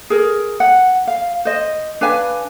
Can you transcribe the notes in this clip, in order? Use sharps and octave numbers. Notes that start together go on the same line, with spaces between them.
G#4 A#4
F#5
F5
C5 D#5
D4 B4 F5 G#5